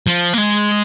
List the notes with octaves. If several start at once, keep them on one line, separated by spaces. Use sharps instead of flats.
F3
A#3
G#3